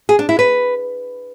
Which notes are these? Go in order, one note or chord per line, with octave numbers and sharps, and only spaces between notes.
G#4
D4
E4
B4